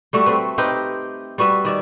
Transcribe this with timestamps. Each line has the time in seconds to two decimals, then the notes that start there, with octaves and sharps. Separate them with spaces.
0.13 G3 A3 F#4 E5
0.26 A3 C4 B4
0.58 C4 D#4 G4 B4
1.38 G3 F#4 B4 E5
1.65 D#3 D5 E5